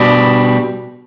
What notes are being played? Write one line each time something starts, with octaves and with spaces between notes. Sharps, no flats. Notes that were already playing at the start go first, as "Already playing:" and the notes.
Already playing: B2 G3 D4